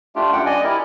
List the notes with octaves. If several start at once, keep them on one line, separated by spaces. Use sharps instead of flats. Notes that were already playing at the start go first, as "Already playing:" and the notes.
A3 D4 F4 G4
F#2 F#5 G5
D5 D#5 G#5
E4 G4 A#4